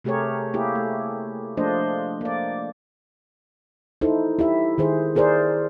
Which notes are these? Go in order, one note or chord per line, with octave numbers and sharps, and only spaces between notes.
C3 A3 G4 G#4 A#4 C#5
A#3 E4 G4 G#4
A3
F3 A3 A#3 D4 C5 D#5
A#3 D5
D#4 E4 A4 C5
E4 G4 E5
D#3 G#4 C5
E4 G#4 A#4 C5 D5